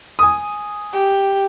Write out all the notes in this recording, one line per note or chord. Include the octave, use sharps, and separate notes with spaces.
G#5 D#6
G4